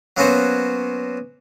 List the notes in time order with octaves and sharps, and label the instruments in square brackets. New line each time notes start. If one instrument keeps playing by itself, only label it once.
[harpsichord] F#3 A#3 B3 C#4 F#4 C5